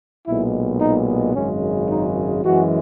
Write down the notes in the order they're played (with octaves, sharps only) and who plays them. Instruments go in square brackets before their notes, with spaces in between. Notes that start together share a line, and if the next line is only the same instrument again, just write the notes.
[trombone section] B1 A#2 G#3 B3 E4
D#4
G#1 F#2 C#3 G#3 C#4
D#4
F#2 E3 G#3 F#4